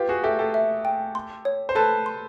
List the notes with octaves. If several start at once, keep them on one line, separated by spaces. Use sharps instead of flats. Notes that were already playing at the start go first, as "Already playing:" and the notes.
Already playing: F4 G4 B4
F#4 G#4
G4 A4 E5
G4 A4
E5
G5
C6
C#5
C5
A4 B4 A5
C6